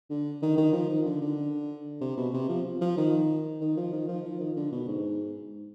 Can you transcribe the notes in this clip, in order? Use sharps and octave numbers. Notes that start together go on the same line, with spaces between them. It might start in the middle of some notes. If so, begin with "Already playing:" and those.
D3
D#3
D#3
F3
D#3
D3
D3
C3
B2
C3
F3
F3
D#3
D#3
F3
D#3
F3
F3
D#3
D3
B2
G#2